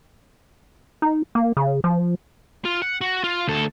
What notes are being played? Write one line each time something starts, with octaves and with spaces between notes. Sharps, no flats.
D#4
A#3
C#3
F3
F4
F#5
F#4
F4
D2 A4